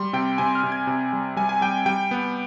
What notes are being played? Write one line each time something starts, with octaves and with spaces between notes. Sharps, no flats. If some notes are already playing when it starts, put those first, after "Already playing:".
Already playing: G3 C6
C3 G5
C3 G#5
F6
C3
G#6
C3
G3
G3 G#5
G#5
G3 G5
G3 G5
B3